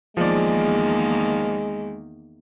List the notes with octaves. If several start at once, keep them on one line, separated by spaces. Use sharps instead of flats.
E2 D#3 F3 G#3 A#3 D5